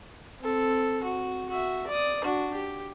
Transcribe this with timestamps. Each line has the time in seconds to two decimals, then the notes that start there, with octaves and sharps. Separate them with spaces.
0.41 C4 A4
1.03 F#4
1.49 F#4 E5
1.87 D5 D#6
2.24 D4 F#4
2.54 G4